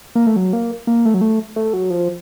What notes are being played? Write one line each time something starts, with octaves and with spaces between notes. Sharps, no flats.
A#3
A3
F#3
A#3
A#3
A3
F#3
A3
A3
F#3
F3